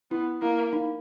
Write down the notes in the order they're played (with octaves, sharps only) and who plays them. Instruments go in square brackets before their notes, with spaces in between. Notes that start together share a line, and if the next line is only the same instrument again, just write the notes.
[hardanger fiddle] B3 [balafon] E4
[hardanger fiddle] A#3 [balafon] E4
[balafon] D#4